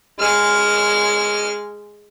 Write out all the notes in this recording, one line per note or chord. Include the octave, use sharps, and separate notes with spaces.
G#3 F6